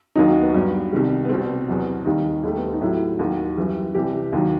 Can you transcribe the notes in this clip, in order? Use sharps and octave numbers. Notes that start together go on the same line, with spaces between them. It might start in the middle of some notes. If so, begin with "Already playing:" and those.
D#2 D#3 F#3 D#4
F#4
B3
G2 F#3 B3
C2 C3 D#3 G3
B3
C2 B2 G3 C4
E2 B2 F#3
D#2 D#3 G3 D#4
D#2 D#3 G3 A3
B3
C4
D#4
A2 F#3 E4
D#2 D#3 F#3 F#4
F#2 E3 G3
C2 C3 E3 G4
D#2 D#3 F#3